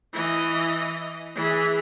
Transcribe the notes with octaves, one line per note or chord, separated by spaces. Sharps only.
E3 D#5
E3 G#4